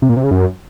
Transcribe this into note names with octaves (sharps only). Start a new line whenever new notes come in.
C3
A#2
C3
C#3
F#2